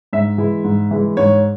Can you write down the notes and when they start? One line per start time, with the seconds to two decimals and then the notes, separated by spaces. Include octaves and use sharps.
0.13 G#2 E5
0.38 E3 G#3 E4
0.64 G#2
0.91 E3 G#3 E4
1.17 G#2 C#5